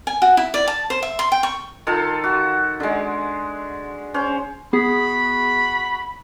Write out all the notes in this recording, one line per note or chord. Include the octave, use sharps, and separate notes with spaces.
G#5
F#4
E4
D5
A5
C5
E5
C6
G5
C#6
D#3 F4 A4
F#4
D3 G#3
C#4 C5
B3 F#4 G#4 B5